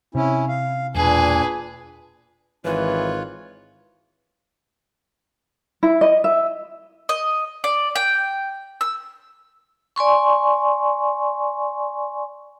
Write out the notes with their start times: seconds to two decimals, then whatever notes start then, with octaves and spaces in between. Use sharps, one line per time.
0.15 C3 C#4 E4
0.49 F5
0.95 E1 A#2 D4 G#4 B4 G#5
2.65 G#1 E3 F4 B4 C#5 F#6
5.83 E4
6.01 D#5
6.24 E5
7.09 D#5
7.64 D5
7.95 G5
8.81 E6
9.96 D5 G#5 C6 C#6